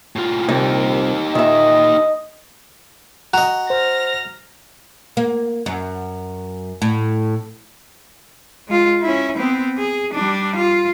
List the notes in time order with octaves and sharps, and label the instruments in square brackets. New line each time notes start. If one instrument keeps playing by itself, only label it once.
[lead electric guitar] A2 F4
[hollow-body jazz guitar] C2 A#2 [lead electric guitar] D#4 G4
[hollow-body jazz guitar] A#2 E5 [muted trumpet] D#5
[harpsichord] F#4 D#5 [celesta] A#5 F#6 F7
[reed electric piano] C5 [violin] F6 A#6
[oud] A#3
F#2
A2
[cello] G#3 F4
C#4 E4
B3 C4
G#4
G3 D4
F4